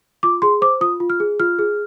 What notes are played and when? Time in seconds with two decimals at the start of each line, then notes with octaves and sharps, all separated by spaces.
0.23 F4 D6
0.42 G#4 C6
0.62 C5 D6
0.81 F4 D#6
1.00 F4
1.10 F6
1.20 G#4
1.40 F4 F6
1.59 G#4